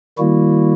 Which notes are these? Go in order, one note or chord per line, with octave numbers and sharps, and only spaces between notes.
D#3 G3 A#3 E4 F#4